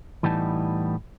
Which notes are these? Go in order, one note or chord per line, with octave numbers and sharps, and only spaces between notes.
A2 E3 G3 B3 D#4 A5